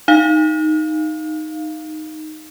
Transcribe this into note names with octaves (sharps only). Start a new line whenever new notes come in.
D#4 F5